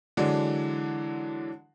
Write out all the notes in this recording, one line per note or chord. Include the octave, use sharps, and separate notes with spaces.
D3 E3 F#3 G#3 D4